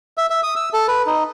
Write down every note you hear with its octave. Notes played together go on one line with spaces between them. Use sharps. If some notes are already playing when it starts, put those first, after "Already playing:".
E5
E5
D#6
E6
A4
B4
D#4